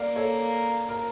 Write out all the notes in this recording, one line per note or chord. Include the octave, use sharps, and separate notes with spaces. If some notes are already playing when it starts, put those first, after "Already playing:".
Already playing: A#3 A#4 D5
A4 C#5
A#4